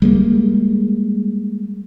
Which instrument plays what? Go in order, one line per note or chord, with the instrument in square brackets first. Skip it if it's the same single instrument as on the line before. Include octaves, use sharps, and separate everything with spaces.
[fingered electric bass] G3 G#3 A#3